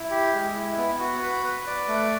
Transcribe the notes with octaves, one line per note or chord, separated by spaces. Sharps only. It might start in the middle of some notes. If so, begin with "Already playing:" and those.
Already playing: E4
G4
G#3
E4
B3
F#4
B4
B4
D5
A3